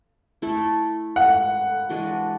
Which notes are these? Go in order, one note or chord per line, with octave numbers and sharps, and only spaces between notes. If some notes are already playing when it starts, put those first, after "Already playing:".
A3 E4 A4
F#5
E3 G#3 D4 F#4